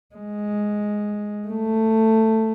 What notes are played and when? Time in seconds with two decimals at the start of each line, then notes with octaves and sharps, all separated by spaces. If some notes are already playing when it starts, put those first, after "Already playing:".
0.15 G#3
1.47 A3